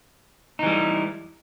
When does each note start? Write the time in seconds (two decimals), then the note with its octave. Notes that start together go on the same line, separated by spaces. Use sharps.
0.59 D#4
0.63 E3
0.66 G3